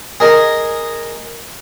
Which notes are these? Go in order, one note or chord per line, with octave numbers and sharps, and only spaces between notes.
G#4 A#4 D#5